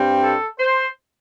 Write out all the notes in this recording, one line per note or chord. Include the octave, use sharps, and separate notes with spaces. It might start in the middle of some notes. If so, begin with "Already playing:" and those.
Already playing: G2 G3 C4
A4
C5